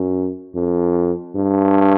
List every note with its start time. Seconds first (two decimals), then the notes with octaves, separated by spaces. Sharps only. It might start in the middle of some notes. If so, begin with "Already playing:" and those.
Already playing: F#2
0.55 F2
1.35 G2